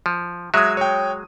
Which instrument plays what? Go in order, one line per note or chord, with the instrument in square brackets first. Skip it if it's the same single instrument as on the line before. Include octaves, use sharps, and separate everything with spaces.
[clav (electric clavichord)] F3
[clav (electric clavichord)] F#3 G#3 [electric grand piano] E5 D#6
[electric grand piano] C#5 G5